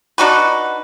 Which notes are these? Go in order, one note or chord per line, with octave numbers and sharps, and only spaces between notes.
D4 D#4 F#4 B4